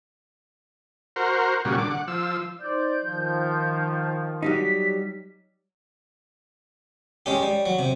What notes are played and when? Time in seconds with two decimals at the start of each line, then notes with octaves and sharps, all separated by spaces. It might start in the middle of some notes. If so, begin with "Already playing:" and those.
1.16 F#4 A#4 C5
1.65 A#2 C#3 G3 F#4
1.78 D3 D6
1.90 F#5
2.08 F3 E6
2.61 D#4 C5 D5 G6
3.02 D#3 F3
4.42 F#3 G3 D#4 B6
7.26 G#3 C#4 G4
7.43 G3
7.66 F#3
7.79 C3